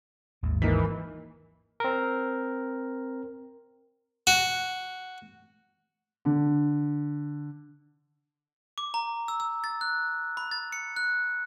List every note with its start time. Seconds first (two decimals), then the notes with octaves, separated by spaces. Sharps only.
0.43 G#1 D#2 G#2
0.62 E3 A#3 D#4 B6
1.80 C4 A#4
4.27 F#4
6.25 D3
8.78 D6
8.94 A#5
9.28 E6
9.40 E6
9.64 A6
9.81 F#6
10.37 B5
10.51 A6
10.72 C#7
10.96 F#6